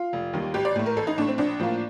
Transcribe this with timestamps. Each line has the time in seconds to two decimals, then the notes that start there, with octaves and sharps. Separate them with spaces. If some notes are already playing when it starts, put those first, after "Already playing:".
Already playing: F4
0.13 F1
0.33 D#2 D#3 G3
0.54 A1 G4
0.65 D5
0.76 A2 A3
0.86 A#4
0.96 A1 A4
1.07 D#4
1.18 A2 A3 D4
1.28 C4
1.38 A#1 D4
1.59 A2 F3 A#3